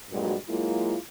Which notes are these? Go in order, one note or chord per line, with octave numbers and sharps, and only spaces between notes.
G2 A#2 F#3 G#3 F#4
F#3 G#3 A#3 E4 F4